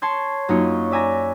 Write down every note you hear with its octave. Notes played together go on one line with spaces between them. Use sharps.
C#5 A5 C6 G#6
F#2 A#3 D#4 F4 F#4 C#5
D5 E5 G#5 A#5 A#6